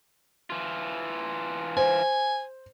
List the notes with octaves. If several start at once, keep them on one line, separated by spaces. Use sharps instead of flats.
E3 F4
C5 G#5